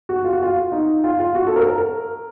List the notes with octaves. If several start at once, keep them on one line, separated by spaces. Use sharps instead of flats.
F#4
F4
F#4
F4
D#4
F4
F4
F#4
A4
A#4
A#4